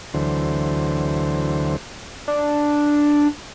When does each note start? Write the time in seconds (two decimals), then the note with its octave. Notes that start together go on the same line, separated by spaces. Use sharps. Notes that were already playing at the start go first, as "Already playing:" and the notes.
0.14 D2 D3 E3 F#3 C5
2.28 D4